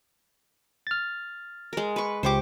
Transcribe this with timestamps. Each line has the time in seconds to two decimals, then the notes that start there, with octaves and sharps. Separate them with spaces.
0.87 F6 A6
1.73 G#3 A#4
1.96 B4 C#6
2.23 C#2 G4 C5 C#6 D6